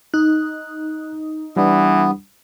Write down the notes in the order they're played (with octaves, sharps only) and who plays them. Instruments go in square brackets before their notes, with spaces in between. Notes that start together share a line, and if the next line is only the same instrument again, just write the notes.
[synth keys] D#4 [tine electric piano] F#6
[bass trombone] E3 [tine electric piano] G3 D4 [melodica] B3